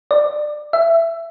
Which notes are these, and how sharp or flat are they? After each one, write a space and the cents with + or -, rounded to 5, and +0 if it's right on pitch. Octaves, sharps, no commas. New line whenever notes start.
D5 +20
E5 +15